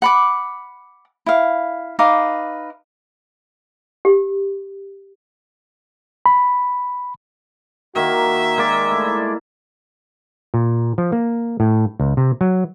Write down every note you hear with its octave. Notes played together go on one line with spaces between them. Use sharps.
F#5 B5 D6
E4 F5
D#4 B4 F5 D6
G4
B5
D#3 A#3 F#4 E5
G#3 A#3 D5
A3 E4
A#2
F3
A#3
A2
C#2
C3
F#3